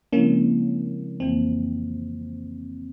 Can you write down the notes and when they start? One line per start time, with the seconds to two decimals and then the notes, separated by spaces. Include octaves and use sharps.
0.13 C#3 F3 G#3 A#3 C4 C#4 E4
1.20 F2 E3 A#3 C4